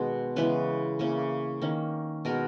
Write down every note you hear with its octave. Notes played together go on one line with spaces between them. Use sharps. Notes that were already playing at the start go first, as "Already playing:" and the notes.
Already playing: B2 D#3 G#3 B3
C#3 E3 G#3 B3 B4
C#3 E3 A#3
D#3 A#3 C#4
B2 G#3 B3 A#4